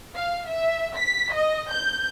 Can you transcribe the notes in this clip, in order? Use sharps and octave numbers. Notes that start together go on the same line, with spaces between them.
F5
E5
B6
D#5
G6